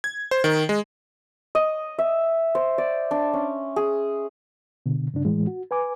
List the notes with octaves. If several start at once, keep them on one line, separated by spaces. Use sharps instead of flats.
G#6
C5
D#3
G#3
D#5
E5
C5
D5
D4
C#4
G#4
B2 D3
G2 C#3 D4
A2 E3 G#3
F#4
B4 G#5 D6